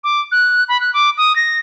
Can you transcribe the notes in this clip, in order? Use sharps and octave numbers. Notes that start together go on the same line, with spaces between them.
D6
F#6
B5
F#6
D6
D#6
A#6